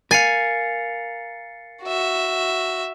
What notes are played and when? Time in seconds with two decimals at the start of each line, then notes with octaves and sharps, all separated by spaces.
0.11 A#4 F5 G#5 A6 C7 C#7
1.83 F#4 E5